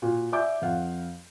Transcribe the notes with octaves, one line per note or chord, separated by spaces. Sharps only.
A#2 F#4
D5 E5 G#5 D6 G6
F2 F5 F#5